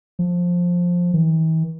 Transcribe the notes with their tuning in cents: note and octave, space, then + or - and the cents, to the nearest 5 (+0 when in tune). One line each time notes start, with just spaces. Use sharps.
F3 +10
E3 -45